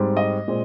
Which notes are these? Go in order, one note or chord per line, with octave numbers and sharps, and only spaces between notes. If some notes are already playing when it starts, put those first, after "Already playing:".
Already playing: G#2 G3 C4
D#5
A#2 G#3 C4